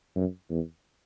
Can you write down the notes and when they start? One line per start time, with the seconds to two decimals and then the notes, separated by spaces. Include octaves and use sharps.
0.15 F#2
0.50 E2